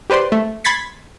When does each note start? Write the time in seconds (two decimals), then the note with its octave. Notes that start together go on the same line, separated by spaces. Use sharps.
0.10 G4 B4 C5 D5 C6
0.32 A3
0.64 B5 C6 G#6 A6 B6 C#7